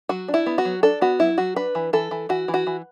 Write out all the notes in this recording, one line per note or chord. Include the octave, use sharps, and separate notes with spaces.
F#3 F#4
D4
E4
B3
F#4
F#3
D4 A4
B3 F#4
F#3 E4
F#3 F#4
D4 B4
E3
E3 A4
E3
E3 F#4
E3
F#4
E3